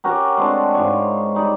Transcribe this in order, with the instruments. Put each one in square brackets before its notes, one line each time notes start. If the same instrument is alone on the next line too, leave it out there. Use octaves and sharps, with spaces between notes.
[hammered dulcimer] C#4 F#4 G4 A#4
G#3 A3 C4 D4
G#2 F4 C#5
G3 D#4 D5